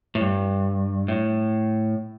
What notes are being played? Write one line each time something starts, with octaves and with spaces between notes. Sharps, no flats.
A2
G2
A2